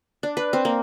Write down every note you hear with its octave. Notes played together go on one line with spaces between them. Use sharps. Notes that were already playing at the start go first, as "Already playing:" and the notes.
D4
B4
C4
A#3